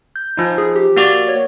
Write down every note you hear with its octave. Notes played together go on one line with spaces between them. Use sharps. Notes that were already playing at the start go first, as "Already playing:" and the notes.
G6
F3 D#4
G#4
G4
A#3 F#4 D5
C#5